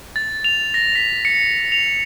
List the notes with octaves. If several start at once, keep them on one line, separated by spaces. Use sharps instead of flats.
A6
F7
A#6
B6
C#7
F7